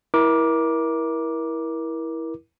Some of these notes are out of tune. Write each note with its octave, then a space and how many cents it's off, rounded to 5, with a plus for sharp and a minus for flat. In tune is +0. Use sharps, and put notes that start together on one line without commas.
E4 -10 A#4 +30 D6 +0